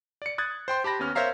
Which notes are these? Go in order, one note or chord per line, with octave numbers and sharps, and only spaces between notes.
D5 C#7
D#6 F#6 G#6 A6
C5 G5 C6
G4 A5 B5 A#6
D#2 B3 C#4 F6
A#4 C5 C#5 E5 F5 A#5